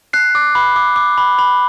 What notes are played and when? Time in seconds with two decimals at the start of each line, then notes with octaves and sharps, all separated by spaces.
0.13 F#6 C7
0.35 D6
0.55 B5
0.76 D6
0.96 D6
1.18 B5
1.39 B5